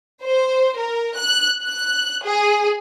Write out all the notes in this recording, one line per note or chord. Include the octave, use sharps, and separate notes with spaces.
C5
A#4
F#6
F#6
G#4